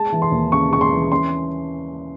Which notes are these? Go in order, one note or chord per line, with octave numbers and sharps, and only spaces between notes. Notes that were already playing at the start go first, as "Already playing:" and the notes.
Already playing: G#3 A5
E3
C6
D#2
C#3 C#6
G#3 C#6
C6
E3
C#4 C6